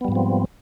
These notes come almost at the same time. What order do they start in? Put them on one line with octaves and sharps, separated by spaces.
B3 G3 G#2 F3 C4